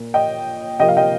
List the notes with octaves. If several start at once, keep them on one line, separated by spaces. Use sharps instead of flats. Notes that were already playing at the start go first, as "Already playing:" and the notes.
Already playing: A#2 A#3
D#5 G5
C3 F3 A#3 D#5 G5
F5
D#5 G5